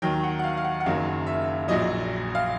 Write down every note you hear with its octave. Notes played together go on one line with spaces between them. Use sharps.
D#2 D#3 F#3 G5
F#5
F#5
F5
F5
F#5
F#5
F#1 F#2 D#3 F#3 F5
E5
A#1 A#2 F#3 D#5
F5